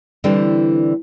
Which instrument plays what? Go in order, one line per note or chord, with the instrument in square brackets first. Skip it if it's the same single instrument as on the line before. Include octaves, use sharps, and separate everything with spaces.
[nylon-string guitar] D3 E3 G3 C4 D4